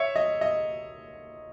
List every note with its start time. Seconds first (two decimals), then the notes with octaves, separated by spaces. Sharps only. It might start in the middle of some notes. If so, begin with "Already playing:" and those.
Already playing: C#5 E5
0.16 D#5
0.41 D#5